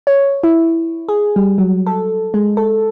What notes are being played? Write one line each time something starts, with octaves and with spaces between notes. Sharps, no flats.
C#5
E4
G#4
G3
F#3
A4
G#3
A4